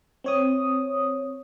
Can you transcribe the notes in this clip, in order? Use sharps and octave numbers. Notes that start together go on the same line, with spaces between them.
C4 C#5 D#6